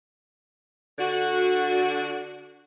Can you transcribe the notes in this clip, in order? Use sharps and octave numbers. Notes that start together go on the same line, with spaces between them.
D3 D4 F#4